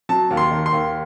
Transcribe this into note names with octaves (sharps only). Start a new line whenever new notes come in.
F#3 A5
D#2
C6
D#3
C6
D#2